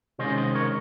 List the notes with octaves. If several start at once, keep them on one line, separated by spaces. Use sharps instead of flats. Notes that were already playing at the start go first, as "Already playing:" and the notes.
C3 D#3 G#3 C#4 C5 D#5
C5 D#5
A#4 C#5